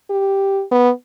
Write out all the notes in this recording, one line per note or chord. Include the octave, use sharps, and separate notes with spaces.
G4
B3